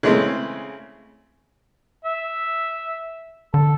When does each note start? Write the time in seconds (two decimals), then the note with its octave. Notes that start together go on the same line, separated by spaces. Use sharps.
0.03 C#3 E3 G#3 A3 C4
2.05 E5
3.54 D3 A4